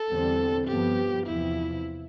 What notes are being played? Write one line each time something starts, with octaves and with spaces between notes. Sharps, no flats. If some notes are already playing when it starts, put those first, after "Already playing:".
Already playing: A4
E2 D3 G3 C4
G2 F3 B3 G4
E2 C3 F3 E4